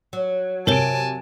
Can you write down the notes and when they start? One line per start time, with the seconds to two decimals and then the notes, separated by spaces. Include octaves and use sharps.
0.13 F#3
0.67 C3 A#4 C#5 G#5 A5 D7 G7